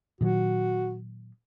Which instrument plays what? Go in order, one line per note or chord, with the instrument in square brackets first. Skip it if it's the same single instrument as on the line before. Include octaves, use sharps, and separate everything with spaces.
[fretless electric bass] A#2 D#3 F#3 [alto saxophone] F#4